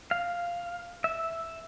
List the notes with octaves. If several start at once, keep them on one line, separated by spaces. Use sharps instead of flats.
F5
E5